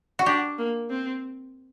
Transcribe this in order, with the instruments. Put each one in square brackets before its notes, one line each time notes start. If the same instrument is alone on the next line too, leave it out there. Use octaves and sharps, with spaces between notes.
[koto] F#4
[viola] D4 [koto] G4
[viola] A#3
C4